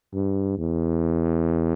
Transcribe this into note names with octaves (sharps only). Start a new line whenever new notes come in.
G2
E2